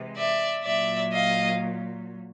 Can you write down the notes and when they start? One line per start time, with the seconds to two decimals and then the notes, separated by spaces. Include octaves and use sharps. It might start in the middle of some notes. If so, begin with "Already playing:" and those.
Already playing: C3 E3 G#3
0.16 D5 E5
0.64 A#2 F#3 D5 E5
1.11 D#5 F5